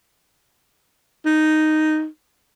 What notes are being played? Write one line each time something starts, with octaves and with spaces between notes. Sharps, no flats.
D#4